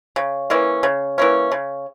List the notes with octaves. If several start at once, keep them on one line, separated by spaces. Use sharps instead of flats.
C#3
E3 A#3 C#4
C#3
E3 A#3 C#4
C#3